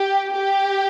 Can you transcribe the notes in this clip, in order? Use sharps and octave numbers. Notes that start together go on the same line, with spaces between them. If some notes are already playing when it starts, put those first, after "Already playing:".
Already playing: G4
G4